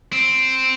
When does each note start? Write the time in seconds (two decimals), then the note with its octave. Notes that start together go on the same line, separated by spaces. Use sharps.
0.13 C4